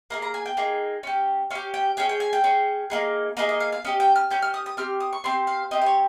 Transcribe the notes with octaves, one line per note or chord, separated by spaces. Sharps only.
A#3 D#4 G#4 A#5
A#5
G#5
G5
A#3 D#4 G#4
C#4 G4
C#4 G4 F5
G5
C#4 G#4 G5
G5
G#5
G5
C#4 G#4
A#3 D#4 G#4
A#3 D#4 G#4 D#5
D#5
F5
F5
C#4 G4 D#5
G5
F6
C#4 G4 G6
F6
D#6
D#6
C4 G4 F6
D#6
C#6
C4 G4 C6
F5
C4 G4 D#5
C5
C#5